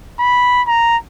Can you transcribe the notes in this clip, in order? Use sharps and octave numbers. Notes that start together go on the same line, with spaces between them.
B5
A#5